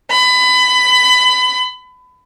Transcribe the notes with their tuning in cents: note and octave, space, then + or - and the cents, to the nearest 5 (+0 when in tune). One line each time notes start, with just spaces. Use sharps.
B5 +25